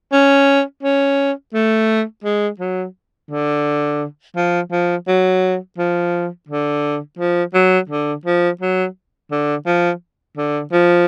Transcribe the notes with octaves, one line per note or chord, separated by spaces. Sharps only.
C#4
C#4
A3
G#3
F#3
D3
F3
F3
F#3
F3
D3
F3
F#3
D3
F3
F#3
D3
F3
D3
F3